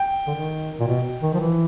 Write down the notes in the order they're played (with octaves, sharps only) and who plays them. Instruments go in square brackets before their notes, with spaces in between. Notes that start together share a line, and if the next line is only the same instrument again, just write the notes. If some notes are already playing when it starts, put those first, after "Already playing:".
Already playing: [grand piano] G5
[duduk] D3
D#3
A#2
B2
D#3
F3
E3